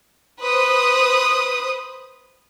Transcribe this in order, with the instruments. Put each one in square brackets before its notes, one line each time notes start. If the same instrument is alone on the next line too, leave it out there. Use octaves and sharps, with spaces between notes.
[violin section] B4 C5 D#6